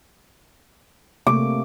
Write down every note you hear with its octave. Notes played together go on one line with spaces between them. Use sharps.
C3 A3 A#3 D6